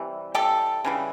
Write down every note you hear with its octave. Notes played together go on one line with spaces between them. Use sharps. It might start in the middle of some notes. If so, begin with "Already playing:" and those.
Already playing: C3 E3 G3
G4 A4
C#3 E3 G3